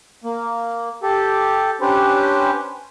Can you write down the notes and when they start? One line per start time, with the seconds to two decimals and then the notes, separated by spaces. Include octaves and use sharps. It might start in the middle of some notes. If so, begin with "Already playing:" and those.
0.24 A#3
1.03 G4 A4
1.81 C#4 D4 G4 B4 C5